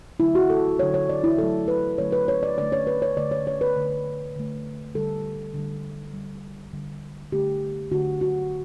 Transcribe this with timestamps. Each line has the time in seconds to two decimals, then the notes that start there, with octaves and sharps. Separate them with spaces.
0.20 D3 F#3 A3 E4
0.35 F#4
0.50 A4
0.79 D3 F#3 A3 C#5
0.94 C#5
1.09 D5
1.24 E4
1.38 D3 F#3 A3 A4
1.68 B4
1.98 D3 F#3 A3 C#5
2.12 B4
2.28 C#5
2.43 D5
2.58 D3 A3 D5
2.72 C#5
2.87 B4
3.02 C#5
3.17 D3 A3 D5
3.31 C#5
3.47 C#5
3.61 B4
3.76 D3 A3
4.36 D3 A3
4.95 D3 G3 A4
5.54 D3 G3
6.13 D3 G3
6.73 D3 G3
7.32 D3 A3 G4
7.92 D3 A3 F#4
8.21 F#4